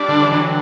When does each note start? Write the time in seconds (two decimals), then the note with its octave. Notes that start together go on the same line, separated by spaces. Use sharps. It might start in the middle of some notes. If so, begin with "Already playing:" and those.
Already playing: G3 D4
0.09 D3
0.22 E3
0.32 D3 F#3